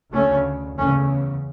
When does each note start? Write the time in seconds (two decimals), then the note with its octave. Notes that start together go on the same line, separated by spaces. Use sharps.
0.12 D2 C#3 A3 C#4
0.78 E2 C#3 A3 C#4